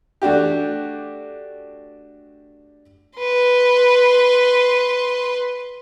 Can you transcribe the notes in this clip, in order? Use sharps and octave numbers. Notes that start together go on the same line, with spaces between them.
A3 D4 F#4 G4
B4 C6